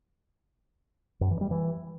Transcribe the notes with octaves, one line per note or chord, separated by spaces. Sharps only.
F#2
E3
G3
E3